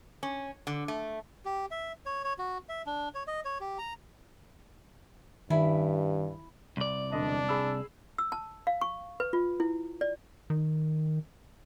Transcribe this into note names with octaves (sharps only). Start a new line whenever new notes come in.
C#4
D3
A3
G4
E5
C#5
C#5
F#4
E5
D4
C#5
D#5
C#5
G4
A#5
G2 D#3 E4 G#5 B5
C2 D5
E1 D3 D4 D#5
G#4 B5 E6
E6
A5
F5
C#6
B4
F4
E4
D5
D#3